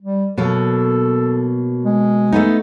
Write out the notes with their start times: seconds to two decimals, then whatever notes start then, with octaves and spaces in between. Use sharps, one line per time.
0.02 G3
0.38 B2 F#3 A#3 A4
1.85 G#3
2.32 A3 B3 D#4